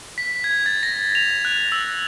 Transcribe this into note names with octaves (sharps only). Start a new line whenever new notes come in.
B6
G#6
A6
A#6
F7
F#6
E6